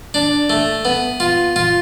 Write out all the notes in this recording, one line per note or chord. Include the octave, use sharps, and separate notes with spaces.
D4
A3
B3
F4
F4